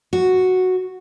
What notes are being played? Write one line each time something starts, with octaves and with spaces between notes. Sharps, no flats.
F#4